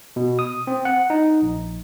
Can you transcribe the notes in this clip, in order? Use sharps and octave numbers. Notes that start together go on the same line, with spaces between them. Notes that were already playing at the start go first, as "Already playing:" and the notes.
B2
D#6
C4
F#5
D#4
A#1